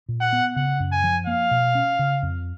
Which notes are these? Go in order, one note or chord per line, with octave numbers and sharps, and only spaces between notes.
A#2
F#5
B3
C#3 F#5
F#2
G#5
F3
A#3 F5
B2
C#4
C#3
F2